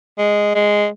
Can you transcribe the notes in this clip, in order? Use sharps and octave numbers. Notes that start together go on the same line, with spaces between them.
G#3
G#3